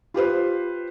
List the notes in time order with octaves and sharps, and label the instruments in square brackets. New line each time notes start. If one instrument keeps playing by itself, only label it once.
[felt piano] F4 G4 B4 C5